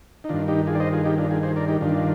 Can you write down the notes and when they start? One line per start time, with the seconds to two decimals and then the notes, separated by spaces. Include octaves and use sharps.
0.24 D#4
0.29 G2 D#3 D4 F4
0.48 D#4 G4
0.67 F4 G#4
0.75 D5
0.80 C5 D#5
0.93 F4 G#4
1.05 D#4 G4
1.18 D4 F4
1.31 F4 G#4
1.43 G#4 C5
1.56 A#4 D5
1.68 D#4 G4
1.81 G2 D#3 D4 F4